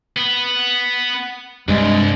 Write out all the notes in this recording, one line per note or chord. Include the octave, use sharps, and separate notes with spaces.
B3
C2 G2 G#3